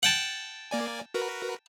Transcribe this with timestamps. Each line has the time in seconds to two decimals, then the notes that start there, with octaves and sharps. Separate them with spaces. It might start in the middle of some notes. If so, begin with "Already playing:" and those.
0.03 F#5 G5 A5
0.71 A#3 D5 G#5
1.14 F#4 A#4 B4